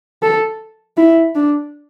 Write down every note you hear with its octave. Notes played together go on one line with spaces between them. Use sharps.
A4
E4
D4